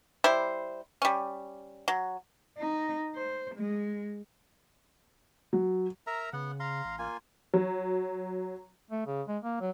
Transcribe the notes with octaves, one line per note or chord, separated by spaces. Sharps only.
G3 E4 C5
G3 C#4
F#3
D#4
C5
G#3
F#3
A#4 E5 A#5
C#3 B3 F#5
F5 A#5 C6
A1
A#3 F4 G#5
F#3
A3
C#3
G#3
A#3
F#3